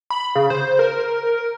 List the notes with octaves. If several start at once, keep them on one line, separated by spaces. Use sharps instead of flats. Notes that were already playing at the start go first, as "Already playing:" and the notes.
B5
C#3
C5
A#4